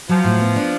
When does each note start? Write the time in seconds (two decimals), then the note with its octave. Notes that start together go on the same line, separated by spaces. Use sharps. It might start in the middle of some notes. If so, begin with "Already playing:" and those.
0.09 F3 F#3
0.24 A2
0.40 B3
0.56 D4